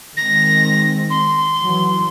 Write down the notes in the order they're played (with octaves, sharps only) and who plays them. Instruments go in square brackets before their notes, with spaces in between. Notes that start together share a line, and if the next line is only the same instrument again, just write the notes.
[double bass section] D#3 G#3 C4 [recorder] A#6
[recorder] C6
[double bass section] E3 F#3